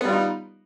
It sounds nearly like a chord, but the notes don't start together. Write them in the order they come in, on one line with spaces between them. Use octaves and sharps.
B3 G3 F4 D#4